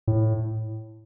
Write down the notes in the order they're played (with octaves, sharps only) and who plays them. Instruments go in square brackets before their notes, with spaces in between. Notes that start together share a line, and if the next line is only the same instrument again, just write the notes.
[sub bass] A2